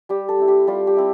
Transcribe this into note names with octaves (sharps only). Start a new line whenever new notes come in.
G3 G4
A4
C4 E4
G4
G3 F4
G4
C4 E4